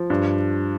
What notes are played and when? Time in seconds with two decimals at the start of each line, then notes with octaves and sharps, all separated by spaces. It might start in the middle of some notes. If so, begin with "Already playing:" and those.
Already playing: F3
0.10 G2